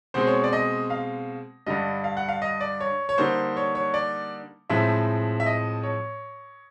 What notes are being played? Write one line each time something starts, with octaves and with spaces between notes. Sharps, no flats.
B2 G#3 C4 C5
C#5
D5
D#5
F5
G2 D3 G3 D#5
F5
F#5
F5
D#5
D5
C#5
C#5
D3 G3 A#3 D#4 C5
C#5
C#5
D5
A2 F3 G#3 C4 E5
E5
D#5
C#5